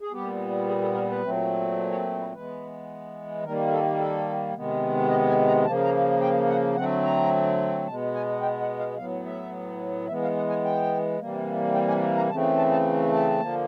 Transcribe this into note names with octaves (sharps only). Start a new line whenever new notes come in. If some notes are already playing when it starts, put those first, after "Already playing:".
G#4
A#2 G3 B3 G4
G#4
A4
A#4
B4
A#2 F#3 A3 C4
C#5
B4
E3 G#3 B3 B4
D#3 G3 A#3 A#4
A#4
A4
A4
C3 D#3 G#3 B3
D#5
G#5
A#5
C#3 F3 A#3 A5
A#5
G5
F#5
D3 F#3 A3 C4 F#5
A#5
B2 G#3 B3 A5
G#5
G5
F#5
F5
A2 F#3 B3 F5
E5
E3 G#3 B3 E5
F5
F#5
G#5
G5
C3 E3 G3 A#3
G5
G#5
A#5
C#3 E3 A3 C4 A5
A5
A5
A5
D3 F3 A#3